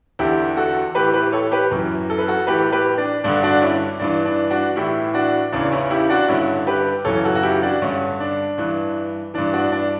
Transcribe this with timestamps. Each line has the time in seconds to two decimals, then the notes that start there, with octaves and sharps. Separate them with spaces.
0.19 E2 D3 E4 G4
0.57 F#4 A4
0.94 A2 E3 G4 B4
1.14 G4 B4
1.33 A4 C#5
1.52 G4 B4
1.71 F#2 E3
2.10 A4
2.18 B4
2.28 F#4 A4
2.47 A2 E3 G4 B4
2.72 G4 B4
2.98 D4
3.24 G2 D3 D4
3.43 D4 F#4
3.62 C#4 E4
4.00 G2 E3 D4
4.25 D4
4.50 D4 F#4
4.76 A2 E3 E4 G4
5.14 D4 F#4
5.52 E2 C#3 E3 D4
5.72 C#4 E4
5.91 E4 G4
6.10 D4 F#4
6.28 G2 D3 C#4 E4
6.67 G4 B4
7.05 F#2 C#3 E3 A4 C#5
7.25 F#4 A4
7.35 F#4
7.43 E4 G4
7.62 D4 F#4
7.82 G2 D3 C#4
8.20 D4
8.58 G2 E3
9.34 G2 E3 D4
9.53 D4 F#4
9.72 D4